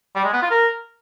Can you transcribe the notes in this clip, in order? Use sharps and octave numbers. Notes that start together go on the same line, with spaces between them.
G3
G#3
B3
F4
A#4